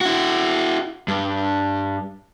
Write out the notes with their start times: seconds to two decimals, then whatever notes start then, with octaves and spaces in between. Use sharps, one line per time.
0.01 E4 F#4
1.08 G2